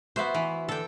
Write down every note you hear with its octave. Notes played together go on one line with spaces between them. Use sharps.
B3 F#4 C5 E5
E3
D3 A4 G5